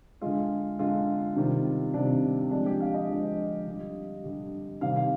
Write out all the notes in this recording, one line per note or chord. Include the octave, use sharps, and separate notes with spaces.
D3 G#3 F4
D3 G#3 F4
C3 D#3 G3
C3 D#3 G3 D4
D3 F3 G#3 D4
G4
F5
D#5
D3 F3 G#3
D3 G3
D3 G3
C3 D#3 G3 F5
F5